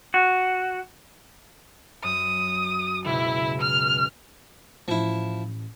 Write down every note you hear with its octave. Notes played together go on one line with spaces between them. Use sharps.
F#4
F#2 D#6
C#2 B2 E4
F6
A1 F3 E4